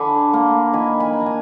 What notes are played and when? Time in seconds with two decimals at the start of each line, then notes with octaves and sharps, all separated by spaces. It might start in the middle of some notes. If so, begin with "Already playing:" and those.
Already playing: D3 G#5 B5 D6
0.34 A#3
0.73 D#3 G#5 B5
1.00 G#5 B5
1.13 D4
1.21 A#5
1.26 G#5